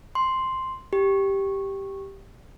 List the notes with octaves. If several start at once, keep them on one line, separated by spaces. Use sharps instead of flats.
C6
G4